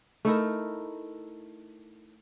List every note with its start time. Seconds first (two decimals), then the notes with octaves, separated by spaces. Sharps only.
0.25 A3 D#4 E4 A#4